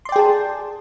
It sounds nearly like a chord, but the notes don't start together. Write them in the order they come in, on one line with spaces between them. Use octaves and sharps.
C6 D5 G5 G#4 A5